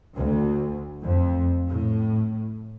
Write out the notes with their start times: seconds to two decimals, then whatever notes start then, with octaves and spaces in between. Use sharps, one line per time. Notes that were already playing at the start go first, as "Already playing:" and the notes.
0.16 D2
1.03 F2
1.68 A2